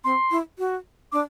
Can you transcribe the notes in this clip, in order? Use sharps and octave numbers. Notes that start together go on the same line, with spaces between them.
C4 C6
E4
F#4
D4 D6